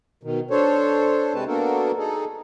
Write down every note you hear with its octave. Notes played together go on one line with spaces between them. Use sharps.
B2 D#3
D4 A4 C5 C#5
C3 G#3 C4 B4 A5
A#3 B3 D4 F#4 A4 A#4
D#4 G#4 A4